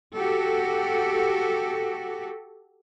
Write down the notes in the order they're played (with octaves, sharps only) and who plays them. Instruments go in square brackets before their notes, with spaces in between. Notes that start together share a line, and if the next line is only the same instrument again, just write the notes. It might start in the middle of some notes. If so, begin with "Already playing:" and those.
[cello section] F#4 G4 A4